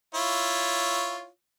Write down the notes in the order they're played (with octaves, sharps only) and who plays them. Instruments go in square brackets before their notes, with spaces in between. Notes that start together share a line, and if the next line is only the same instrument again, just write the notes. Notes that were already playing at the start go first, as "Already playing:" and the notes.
[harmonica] E4 F4 C#5